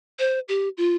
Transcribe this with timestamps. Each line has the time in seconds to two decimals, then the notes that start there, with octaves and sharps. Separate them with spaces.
0.19 C5
0.48 G4
0.77 F4